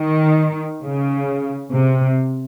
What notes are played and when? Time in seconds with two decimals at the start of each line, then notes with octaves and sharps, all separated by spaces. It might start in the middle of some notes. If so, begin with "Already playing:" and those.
Already playing: D#3
0.82 C#3
1.73 C3